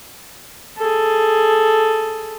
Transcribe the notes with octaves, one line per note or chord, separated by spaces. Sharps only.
G#4 A4